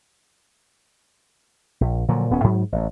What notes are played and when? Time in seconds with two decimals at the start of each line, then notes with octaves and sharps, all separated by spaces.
1.81 A#1
2.08 A#2 D3 F3 F#3
2.30 D#1 B3 C#4
2.44 G#2 F#3
2.72 A1